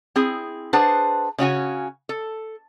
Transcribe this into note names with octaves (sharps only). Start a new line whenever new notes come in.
C4 E4 G#4
D4 G#4 B4 C5 F#5 A5
C#3 C#4 F#4 G#5
A4